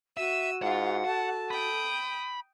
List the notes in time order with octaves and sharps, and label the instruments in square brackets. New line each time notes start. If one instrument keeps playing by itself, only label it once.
[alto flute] F#4 [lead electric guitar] E5 [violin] E6 D#7
[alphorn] G#2 [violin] F4 [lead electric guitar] F#5
[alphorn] A4 [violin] A5
[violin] G5 D#6 [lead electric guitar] B5